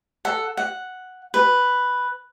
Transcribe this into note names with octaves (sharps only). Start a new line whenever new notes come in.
A4 F#5
F#5
B4